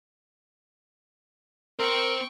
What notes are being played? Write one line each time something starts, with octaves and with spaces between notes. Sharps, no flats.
C4 A#4 C5 G5 C#6